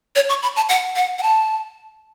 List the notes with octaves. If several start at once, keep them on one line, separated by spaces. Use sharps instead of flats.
C#5
C#6
B5
A5
F#5
F#5
F#5
A5